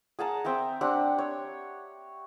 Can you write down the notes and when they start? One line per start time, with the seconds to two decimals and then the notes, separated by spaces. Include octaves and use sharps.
0.19 G#4 F#5 A5 A#5
0.45 C4 E5 G5 A#5
0.81 C4 D4 G4 F#5
1.18 C#5